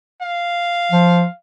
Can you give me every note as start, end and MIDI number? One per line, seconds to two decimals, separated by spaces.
0.22 1.35 77
0.91 1.26 53